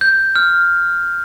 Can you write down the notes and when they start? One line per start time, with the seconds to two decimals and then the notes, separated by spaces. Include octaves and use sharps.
0.01 G6
0.36 F6